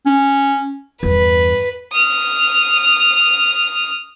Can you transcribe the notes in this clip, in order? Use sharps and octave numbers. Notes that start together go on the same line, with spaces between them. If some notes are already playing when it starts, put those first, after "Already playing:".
C#4
E2 G2 B4
D#6 F6